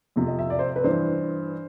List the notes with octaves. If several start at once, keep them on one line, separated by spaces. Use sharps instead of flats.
F2 C3 F3
D#5
E5
D5
C5
B4
G2 E3 C5